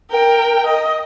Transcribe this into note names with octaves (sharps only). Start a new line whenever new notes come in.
A#4 G5
D#5